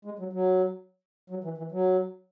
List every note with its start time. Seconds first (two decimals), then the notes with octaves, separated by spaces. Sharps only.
0.05 G#3
0.19 F#3
0.33 F#3
1.30 F#3
1.44 E3
1.58 E3
1.72 F#3